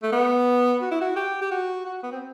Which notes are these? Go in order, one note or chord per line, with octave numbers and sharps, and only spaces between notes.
A3
B3
F#4
E4
F#4
G4
G4
F#4
F#4
B3
C4